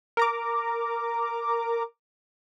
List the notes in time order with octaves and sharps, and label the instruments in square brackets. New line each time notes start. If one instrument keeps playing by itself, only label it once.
[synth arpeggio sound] A#4 A#5 D6